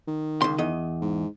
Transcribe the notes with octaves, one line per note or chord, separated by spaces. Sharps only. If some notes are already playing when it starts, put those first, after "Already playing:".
D#3
C#2 C6
E2 D#5
G#2